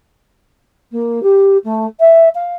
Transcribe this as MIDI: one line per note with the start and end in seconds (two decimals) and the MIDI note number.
0.91 1.22 58
1.22 1.57 67
1.64 1.85 57
2.00 2.28 76
2.35 2.56 77